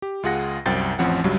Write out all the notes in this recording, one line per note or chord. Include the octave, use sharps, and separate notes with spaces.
G4
C#2 F4 G#4 F#5 A#6
C2 F#2 C5 G5 A6
A1 F2 F3 C4 C#4 F#5
C#2 G2 F#3 G3